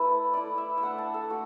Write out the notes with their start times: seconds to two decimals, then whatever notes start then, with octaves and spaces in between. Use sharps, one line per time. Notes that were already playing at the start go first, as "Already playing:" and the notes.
Already playing: A3 E4 A4 B4 E5
0.33 A3 E4 D5
0.58 E5
0.78 E5
0.83 A3 D4 F#5
0.98 A5
1.14 A4
1.30 A3 F#4